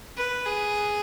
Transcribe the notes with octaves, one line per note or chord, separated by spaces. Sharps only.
B4
G#4